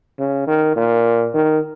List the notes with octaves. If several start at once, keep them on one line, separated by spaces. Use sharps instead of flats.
C#3
D#3
A#2
D#3